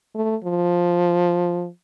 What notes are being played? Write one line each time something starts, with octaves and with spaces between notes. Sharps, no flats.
A3
F3